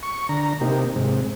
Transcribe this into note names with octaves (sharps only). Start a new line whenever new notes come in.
C#6
D3 A#5
C3 A#3 D#4 G4
G#2 C3